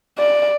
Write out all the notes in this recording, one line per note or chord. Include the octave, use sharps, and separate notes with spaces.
D5